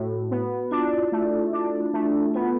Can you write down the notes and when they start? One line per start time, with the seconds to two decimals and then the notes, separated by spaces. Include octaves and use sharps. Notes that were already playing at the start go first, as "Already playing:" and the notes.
Already playing: A2 F#4
0.31 B3
0.71 D4 F4
0.79 E4
0.87 F4
1.12 A3
1.53 D4
1.93 A3
2.34 B3 F4